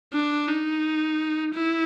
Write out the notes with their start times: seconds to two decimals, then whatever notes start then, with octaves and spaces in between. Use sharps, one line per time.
0.13 D4
0.48 D#4
1.55 E4